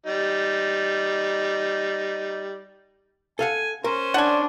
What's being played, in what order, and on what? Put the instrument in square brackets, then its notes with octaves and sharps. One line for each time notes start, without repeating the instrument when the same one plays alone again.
[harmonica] G3 D#4
[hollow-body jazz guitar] A4 F5 F#5 [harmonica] G#5
[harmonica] C#4 C5 [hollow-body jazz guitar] A#4
[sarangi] D4 [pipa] F#5 G#5